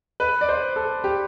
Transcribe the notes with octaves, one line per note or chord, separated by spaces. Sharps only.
B4
D5
C5
A4
G4